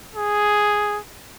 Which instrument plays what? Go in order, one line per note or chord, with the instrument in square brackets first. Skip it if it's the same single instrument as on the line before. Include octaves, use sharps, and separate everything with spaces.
[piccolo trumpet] G#4